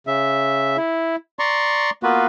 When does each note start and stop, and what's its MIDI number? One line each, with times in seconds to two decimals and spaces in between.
0.07 0.77 49
0.07 0.77 76
0.77 1.16 64
1.39 1.90 74
1.39 1.90 82
1.39 1.90 84
1.39 1.90 85
2.03 2.27 58
2.03 2.27 59
2.03 2.27 65
2.03 2.27 66
2.03 2.27 71